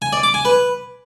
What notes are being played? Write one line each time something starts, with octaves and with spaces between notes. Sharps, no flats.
G#5
D5
D6
G#5
B4